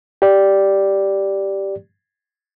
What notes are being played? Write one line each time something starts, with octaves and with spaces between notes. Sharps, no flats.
G4 D5